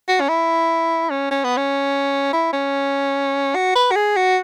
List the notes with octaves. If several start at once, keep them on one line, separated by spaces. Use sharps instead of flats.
F#4
C#4
E4
C#4
C#4
B3
C#4
E4
C#4
F#4
B4
F#4
G#4
F#4